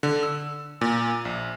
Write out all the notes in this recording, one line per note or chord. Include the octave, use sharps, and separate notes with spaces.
D3
E6
A#2
A#1